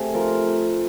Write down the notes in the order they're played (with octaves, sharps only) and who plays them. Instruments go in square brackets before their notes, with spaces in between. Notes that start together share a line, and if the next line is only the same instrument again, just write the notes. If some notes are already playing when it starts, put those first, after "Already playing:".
Already playing: [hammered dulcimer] C3 A3 G#4
F3 A#4